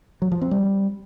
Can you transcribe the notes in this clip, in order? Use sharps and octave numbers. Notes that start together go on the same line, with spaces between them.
F#3
F3
C4
G3